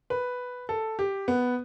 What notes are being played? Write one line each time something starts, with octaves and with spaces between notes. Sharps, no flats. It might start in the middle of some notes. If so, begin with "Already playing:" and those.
B4
A4
G4
B3